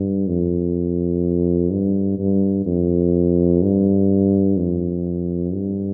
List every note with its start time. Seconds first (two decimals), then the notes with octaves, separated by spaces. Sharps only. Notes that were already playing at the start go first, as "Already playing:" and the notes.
Already playing: G2
0.27 F2
1.70 G2
2.18 G2
2.66 F2
3.62 G2
4.57 F2
5.54 G2